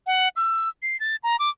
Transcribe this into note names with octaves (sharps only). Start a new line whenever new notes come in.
F#5
E6
C7
A6
A#5
D6